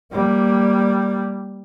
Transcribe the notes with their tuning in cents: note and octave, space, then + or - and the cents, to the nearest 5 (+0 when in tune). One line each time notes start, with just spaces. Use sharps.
G3 +0 A#3 +0